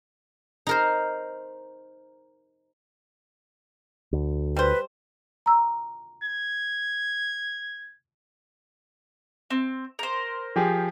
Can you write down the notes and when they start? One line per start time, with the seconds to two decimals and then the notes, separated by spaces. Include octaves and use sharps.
0.67 D#4 A#4 C5
4.13 D2
4.56 G3 B4 C5
5.46 A#5 E6
6.23 G#6
9.50 C4
9.99 A#4 C5
10.56 F3 G4 G#4